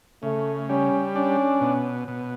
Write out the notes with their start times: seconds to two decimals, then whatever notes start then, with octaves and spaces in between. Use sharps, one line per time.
0.23 C#3 A3
0.69 G3 C#4
1.15 C#4 D4
1.61 B2
2.08 B2